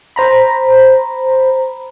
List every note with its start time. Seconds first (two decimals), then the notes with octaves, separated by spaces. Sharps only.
0.16 C5 A#5 B5